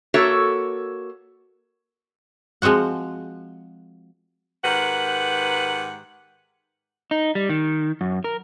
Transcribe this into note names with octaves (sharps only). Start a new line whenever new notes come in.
A#3 F#4 A4 C#5 E5
F3 G#3 C4 F#4 F#5
G#2 D#3 G4 A#4 B4 F#5
D#4
G3
D#3
F#2
A#4